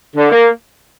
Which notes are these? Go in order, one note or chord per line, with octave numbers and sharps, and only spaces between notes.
D3
A#3